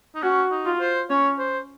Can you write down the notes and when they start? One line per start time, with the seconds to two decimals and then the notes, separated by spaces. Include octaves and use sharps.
0.15 D#4
0.22 C#4 F#4
0.51 D#4
0.65 F4
0.81 C5
1.10 C#4 C#5
1.38 C5